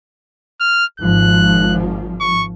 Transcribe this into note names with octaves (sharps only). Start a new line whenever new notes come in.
F6
G#1 G#2 F3 F#6
C#6